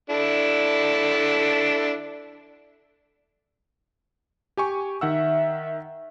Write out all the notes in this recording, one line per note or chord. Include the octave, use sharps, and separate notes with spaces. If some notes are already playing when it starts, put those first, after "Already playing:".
D4 E4 A4
G4 G#5 C#6
D#3 E5 F#5 E6